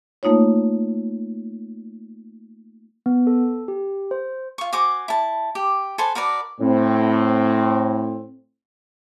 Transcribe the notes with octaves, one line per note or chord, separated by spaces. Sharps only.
A3 A#3 D#4 F4 C#5
B3
A4
G4
C5
F4 C#6
F#4 C5 G#5 D6
E4 A5
G4
A4 B4 C5 G#5
F#4 A#4 B4 D5
A2 C4